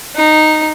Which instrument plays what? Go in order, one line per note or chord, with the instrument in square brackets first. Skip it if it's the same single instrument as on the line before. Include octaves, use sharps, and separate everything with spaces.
[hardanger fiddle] D#4